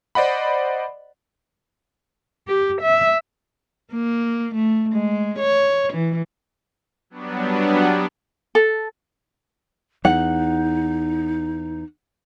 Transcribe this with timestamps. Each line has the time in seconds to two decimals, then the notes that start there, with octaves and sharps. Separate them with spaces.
0.15 C5 D5 D#5 F#5 B5
2.48 G4
2.82 E5
3.93 A#3
4.54 A3
4.93 G#3
5.39 C#5
5.93 E3
7.10 F#3 G3 B3 D4
8.55 A4
10.05 E2 D#4 F#5